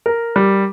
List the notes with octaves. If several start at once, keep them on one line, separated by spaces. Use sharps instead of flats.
A#4
G3